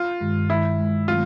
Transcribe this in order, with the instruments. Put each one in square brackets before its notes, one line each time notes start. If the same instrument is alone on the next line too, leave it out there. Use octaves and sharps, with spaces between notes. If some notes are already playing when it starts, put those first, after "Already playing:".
Already playing: [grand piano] F4
[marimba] G2 D#3 G#3
[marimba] G2 D#3 G#3 [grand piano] E4
[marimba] G2 D#3 G#3
[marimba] D#3 F#3 A3 C4 [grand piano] F4